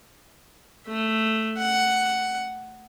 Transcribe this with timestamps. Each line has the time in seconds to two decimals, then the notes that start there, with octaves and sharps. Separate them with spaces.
0.87 A3
1.58 F#5